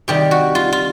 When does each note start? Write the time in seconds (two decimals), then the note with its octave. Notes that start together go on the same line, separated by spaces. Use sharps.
0.08 C3 D#3 G3 G4
0.31 F#4
0.55 F4
0.72 F4